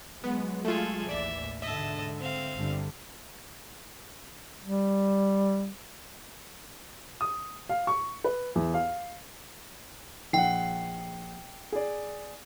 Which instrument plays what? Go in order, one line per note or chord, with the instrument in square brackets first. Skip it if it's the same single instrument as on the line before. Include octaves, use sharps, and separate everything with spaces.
[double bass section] F#3 G#3 [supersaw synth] B3
[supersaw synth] A3 F4 [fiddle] G#4 A4
[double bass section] A1 D#2 E3 [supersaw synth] D5 [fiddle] E5
[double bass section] G#2 B2 D3 [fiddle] D#5 A5 [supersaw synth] E5
[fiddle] C4 F5
[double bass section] G1 D3 G3
[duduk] G3
[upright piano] D#6
F5
C#6
B4
E2
F5
[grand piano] A#1 F#5 [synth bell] G5 C7
[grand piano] G#4 D5